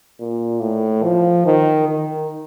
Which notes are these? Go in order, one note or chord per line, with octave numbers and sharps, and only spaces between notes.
A#2
A2
F3
D#3
D#3